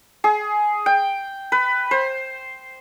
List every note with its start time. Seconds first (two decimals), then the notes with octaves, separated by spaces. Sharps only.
0.24 G#4
0.86 G5
1.52 B4
1.91 C5